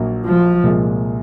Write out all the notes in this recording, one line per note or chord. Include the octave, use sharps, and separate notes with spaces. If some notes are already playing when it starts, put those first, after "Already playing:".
Already playing: A#1 A#2 F#3 A#3
F3
C2 A#2 G#3